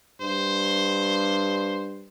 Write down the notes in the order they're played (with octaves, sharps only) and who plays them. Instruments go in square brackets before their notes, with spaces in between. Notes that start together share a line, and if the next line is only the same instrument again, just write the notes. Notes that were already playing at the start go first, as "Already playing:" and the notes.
[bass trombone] G2 [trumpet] C5